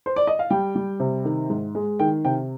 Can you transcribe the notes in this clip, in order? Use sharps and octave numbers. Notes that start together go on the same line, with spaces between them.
C5
D5
D#5
F5
G3 G5
G3
C3
D#3
G#2
G#3
D#3 G5
C3 G5